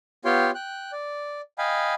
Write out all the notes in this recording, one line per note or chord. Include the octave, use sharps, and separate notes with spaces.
B3 F4 G4 C#5 G5 C6
G5 F#6
D5
D#5 F5 G5 G#5 B5